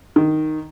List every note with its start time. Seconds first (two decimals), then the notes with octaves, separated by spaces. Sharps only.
0.16 D#3